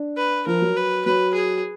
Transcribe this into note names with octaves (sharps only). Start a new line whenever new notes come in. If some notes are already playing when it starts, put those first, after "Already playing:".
Already playing: D4
B4
F3 A#4
F#3
B4
F#3 B4
G#4